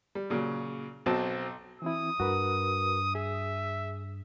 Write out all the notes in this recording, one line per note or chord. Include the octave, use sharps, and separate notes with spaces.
G3
A#2 C#3 F#3
B1 F#3 C4 A5
E3 C4 E4 D#6
G2 F#4 A#4 B4
G#4 E5